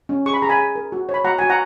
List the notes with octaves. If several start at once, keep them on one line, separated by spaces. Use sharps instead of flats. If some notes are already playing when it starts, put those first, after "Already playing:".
C#4
G#4 C#6
B5
G#4 A#5
G#5 B5
G#4
A#4
F#4
C#5
B5
F#4 F#5 A#5
F#4 G#5
F#5 A#5